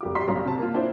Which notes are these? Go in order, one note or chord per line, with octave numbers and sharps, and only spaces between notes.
F1 G4 D6
G3 D5 C6 B6
B1 G2 C#4 A#5
C3 A5
A#3 F4
D4 E4 C5